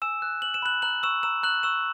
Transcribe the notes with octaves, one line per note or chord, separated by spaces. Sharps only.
G#5 E6 E7
F#6
F#6 F#7
E7
B5 F#6 F#7
A#5 F#6 F#7
C#6 E6 E7
A#5 E6 E7
A#5 F#6 F#7
C#6 E6 E7